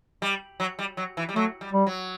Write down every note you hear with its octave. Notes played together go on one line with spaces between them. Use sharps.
G3
F#3
G3
F#3
E3
G3
F#3 A3
G3
G3
F#3